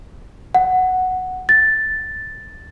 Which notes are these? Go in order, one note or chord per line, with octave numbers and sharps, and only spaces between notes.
F#5
A6